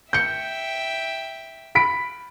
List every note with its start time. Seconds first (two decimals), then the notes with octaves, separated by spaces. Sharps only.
0.13 E5 G5 G6 C#7
1.75 B5 B6 D7